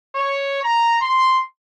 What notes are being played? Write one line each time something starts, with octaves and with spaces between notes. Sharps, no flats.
C#5
A#5
C6